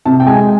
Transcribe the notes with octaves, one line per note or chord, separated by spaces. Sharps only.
C3 A5
G5
G#3 G#5